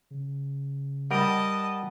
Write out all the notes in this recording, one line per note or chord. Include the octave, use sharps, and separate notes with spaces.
C#3
G3 A#4 D#5 F#5 A5 B5